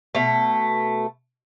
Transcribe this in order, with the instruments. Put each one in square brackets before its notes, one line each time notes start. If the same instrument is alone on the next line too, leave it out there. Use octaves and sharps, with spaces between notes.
[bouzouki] B2 A3